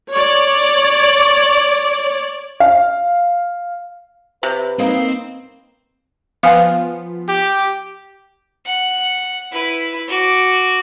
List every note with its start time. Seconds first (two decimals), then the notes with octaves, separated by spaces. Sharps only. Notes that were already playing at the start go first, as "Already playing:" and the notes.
0.13 C#5 D5
2.60 F5
4.43 C3 B4
4.79 A#3 C4 D#4
6.43 F3 B3 F4 F5 G#5
7.29 G4
8.65 F#5
9.52 E4 B4
10.07 F#4 D6